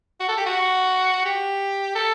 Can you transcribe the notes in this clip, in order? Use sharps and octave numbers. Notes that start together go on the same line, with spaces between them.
F#4
A4
G4
F#4
G4
A4